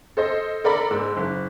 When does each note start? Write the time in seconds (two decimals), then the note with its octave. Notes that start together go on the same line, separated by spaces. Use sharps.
0.17 A4 C5 D#5
0.64 A4 A#4 D5 B5
0.91 G#2 E6
1.17 F#1